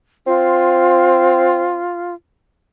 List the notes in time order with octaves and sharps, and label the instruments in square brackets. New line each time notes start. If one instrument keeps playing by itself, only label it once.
[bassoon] C4 [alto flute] F4